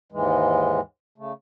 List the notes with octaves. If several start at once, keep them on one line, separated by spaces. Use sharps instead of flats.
D#2 G#2 E3 G#3
C#3 A3